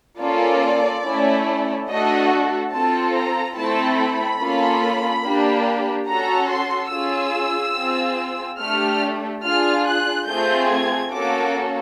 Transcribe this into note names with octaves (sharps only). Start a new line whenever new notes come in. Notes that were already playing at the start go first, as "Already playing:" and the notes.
A#3 C#4 F4 A4 D5
A3 C#4 E4
A3 D4 F#4 A4 D#5
C4 F4 A4 A5
A#5
A3 C4 E4 A4 A5
B5
A#3 C#4 F4 A4
A#3 D4 G4
C#4 F#4 A4 A#5
C6
C#4 F4 G#4 E6
C4 F4 G#4
A3 D4 G4 F6
D4 F4 G#4 F6
F#6
A3 C4 F4 G#4 G6
G#6
A#3 C#4 F#4 A4 D6